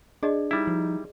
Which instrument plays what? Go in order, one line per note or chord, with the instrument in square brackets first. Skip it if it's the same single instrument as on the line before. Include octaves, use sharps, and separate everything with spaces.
[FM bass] D4 [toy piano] G#4 D5 D#5
[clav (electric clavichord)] G3 E4 [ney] D#4
[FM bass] F3